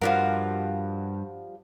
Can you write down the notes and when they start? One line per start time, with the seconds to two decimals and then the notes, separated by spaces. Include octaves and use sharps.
0.01 G2 F3 G3 F4 F#4 A#4 F#5